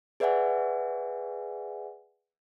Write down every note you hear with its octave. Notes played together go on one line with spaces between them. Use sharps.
G#4 B4 D5 E5 F#5 G#5